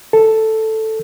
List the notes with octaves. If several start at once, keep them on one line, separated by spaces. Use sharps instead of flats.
A4